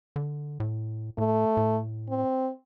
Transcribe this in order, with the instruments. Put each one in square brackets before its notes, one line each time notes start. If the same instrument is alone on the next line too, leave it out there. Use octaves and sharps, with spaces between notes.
[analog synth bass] D3
A2
[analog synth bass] A2 [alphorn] A3
[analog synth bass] A2
[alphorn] C4